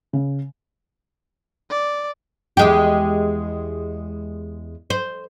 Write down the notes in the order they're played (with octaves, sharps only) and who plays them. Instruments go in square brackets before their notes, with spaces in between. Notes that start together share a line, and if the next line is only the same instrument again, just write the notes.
[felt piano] C#3
[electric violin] D5
[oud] E2 G#3 G4
C5